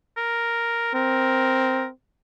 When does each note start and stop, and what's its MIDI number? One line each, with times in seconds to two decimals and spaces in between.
0.17 0.93 70
0.95 1.91 60
0.95 1.85 70